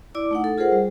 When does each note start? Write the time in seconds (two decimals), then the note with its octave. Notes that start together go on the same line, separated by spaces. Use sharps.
0.15 E4 D5 D6
0.31 A3 D#4 F#5
0.44 A4
0.58 F4 G#4 A#4 C5 F#5
0.72 G3